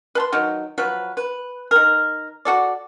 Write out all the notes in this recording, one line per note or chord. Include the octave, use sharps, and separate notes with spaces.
B4 A5 C6
D#3 F#3
F3 F#3 B4
B4
D#3 A#4
F#4 A4 D5